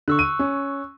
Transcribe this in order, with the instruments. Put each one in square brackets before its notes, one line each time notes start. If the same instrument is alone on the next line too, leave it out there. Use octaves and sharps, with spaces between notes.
[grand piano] D3 [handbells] C#6 E6 F#6
[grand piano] D#7
C#4